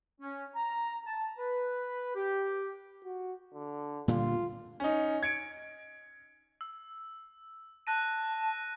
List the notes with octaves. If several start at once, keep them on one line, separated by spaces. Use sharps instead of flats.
C#4
A#5
A5
B4
G4
F#4
D3
A#2 D3 G3 F4
C#4 D#4
G#6 C#7 D7
E6
A5 F#6 A#6 D#7